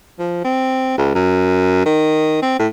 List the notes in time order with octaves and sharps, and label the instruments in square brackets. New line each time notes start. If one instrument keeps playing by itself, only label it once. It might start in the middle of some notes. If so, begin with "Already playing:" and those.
[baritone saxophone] F3
C4
C#2
F#2
D#3
C4
A2